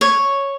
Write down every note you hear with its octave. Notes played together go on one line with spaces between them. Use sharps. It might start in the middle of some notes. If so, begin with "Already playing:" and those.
C#5